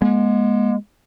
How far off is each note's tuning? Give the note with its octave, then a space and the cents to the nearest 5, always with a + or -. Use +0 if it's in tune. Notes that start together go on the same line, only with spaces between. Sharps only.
G#3 +0 B3 -45